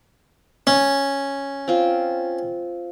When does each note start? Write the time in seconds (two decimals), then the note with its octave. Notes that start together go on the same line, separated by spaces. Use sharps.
0.67 C#4
1.68 C4 F4